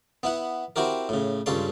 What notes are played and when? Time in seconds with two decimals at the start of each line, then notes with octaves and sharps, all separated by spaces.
0.23 B3 E4 F#5
0.76 C4 E4 F#4 G4 A#4
1.09 A2 C#3
1.46 C#2 G2 C#3 A4 C#5 C6